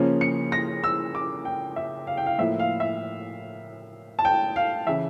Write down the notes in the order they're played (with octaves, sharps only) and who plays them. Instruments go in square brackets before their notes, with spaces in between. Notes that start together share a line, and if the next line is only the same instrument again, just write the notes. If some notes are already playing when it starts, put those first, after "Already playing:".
Already playing: [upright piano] C#3 F3 A#3 C#4
C#7
A#6
E6
D6
G5
E5
F5
G5
F5
A2 F3 A#3 E4 E5
F5
E5
A5
G5
F5
C#3 E3 E5